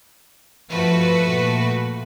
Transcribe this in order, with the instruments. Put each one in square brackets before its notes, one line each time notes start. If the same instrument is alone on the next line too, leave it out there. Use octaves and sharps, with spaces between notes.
[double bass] G2 F3 [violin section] A3 F#4 B4
[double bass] A#2